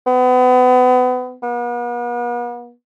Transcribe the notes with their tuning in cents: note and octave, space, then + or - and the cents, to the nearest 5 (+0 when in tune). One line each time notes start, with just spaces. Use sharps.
B3 +30
B3 -45